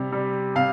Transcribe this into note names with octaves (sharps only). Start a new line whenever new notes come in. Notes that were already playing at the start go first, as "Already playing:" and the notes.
Already playing: C3 G3
G3
C3 F5